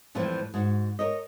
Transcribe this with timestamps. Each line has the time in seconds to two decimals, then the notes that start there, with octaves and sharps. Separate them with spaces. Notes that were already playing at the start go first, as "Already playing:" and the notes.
0.15 F2 A2 E3 F3 G3 C4
0.54 G#2 F#4
0.99 A#4 C#5 D#5